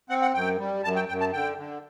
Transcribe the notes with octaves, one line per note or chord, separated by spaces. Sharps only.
C4 F#5
F#5
F#2 G5
G3
F#2 A5
G5
F#2 G5
A5
D3 G5
D3